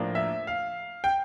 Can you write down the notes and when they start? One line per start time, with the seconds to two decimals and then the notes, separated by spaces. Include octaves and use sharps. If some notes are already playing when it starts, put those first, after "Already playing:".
Already playing: A2 F3 A#3 D4
0.15 E5
0.47 F5
1.04 G5